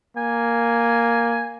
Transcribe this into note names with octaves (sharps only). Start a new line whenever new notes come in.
A#3 G#5